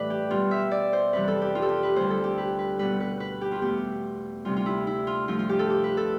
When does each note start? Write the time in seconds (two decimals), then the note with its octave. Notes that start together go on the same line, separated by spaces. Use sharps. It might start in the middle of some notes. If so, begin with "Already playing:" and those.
Already playing: A2 E3 G3 B4 D5
0.10 G4
0.30 B2 G3 F4
0.51 E5
0.71 D5
0.93 C5
1.13 F2 C3 E3 G3 B4
1.28 A4
1.42 G4
1.55 F4
1.62 A4
1.69 G4
1.83 B4
1.95 D2 D3 G3 C5
2.10 A4
2.24 G4
2.38 B4
2.59 B4
2.79 B2 G3 B4
3.00 B4
3.20 B4
3.41 G4
3.52 F4
3.62 E2 B2 A3 G4
4.45 D2 C3 G3 F4
4.56 F4
4.66 E4
4.87 E4
5.07 F4
5.28 G2 F3 A3 F4
5.39 F4
5.49 G4
5.59 A4
5.70 G4
5.84 B4
5.97 A4